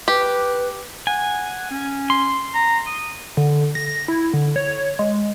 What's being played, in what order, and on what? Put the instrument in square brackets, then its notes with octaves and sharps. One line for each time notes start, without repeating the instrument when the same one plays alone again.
[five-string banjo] G4 [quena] B4
[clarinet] F#5 [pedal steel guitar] G#5
[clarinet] C#4
[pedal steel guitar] C6
[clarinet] A#5
D#6
[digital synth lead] D3
A#6
E4
D3
C#5
G#3